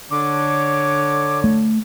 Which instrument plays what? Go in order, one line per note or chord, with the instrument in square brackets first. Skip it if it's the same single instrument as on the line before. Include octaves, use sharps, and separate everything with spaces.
[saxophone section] D3 [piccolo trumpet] C#5 [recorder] D6
[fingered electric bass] A3